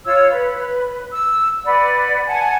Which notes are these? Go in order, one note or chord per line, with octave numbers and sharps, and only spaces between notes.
F4 C#5 E6
B4
E6
B4 D5 F#5
F#5 G#5 A5